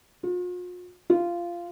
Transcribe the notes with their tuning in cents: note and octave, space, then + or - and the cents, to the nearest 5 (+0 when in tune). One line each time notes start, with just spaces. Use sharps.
F4 +45
F4 -15